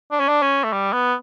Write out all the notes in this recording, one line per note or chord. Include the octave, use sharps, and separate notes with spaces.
D4
C#4
D4
C#4
A3
G3
B3